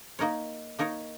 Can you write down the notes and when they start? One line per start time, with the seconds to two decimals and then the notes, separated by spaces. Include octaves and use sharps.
0.19 A#3 D#4 A#4 C#5
0.79 A#3 D#4 A#4 C#5